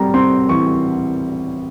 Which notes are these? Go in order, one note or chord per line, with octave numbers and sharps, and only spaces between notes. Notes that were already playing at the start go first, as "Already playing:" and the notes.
Already playing: G3 C4 A#5
C4 C6
E3 C#6